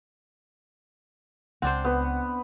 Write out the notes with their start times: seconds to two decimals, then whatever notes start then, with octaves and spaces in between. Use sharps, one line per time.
1.62 C#2 C4 D4 C5 F#5
1.84 B3 B4